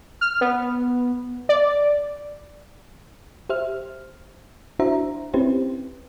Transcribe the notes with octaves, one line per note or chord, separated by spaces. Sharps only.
F6
B3
D5
G4 C5 E5 F6
D4 E4 F#4 C5 E5 A#5
C4 C#4 E4 G4 B4 C5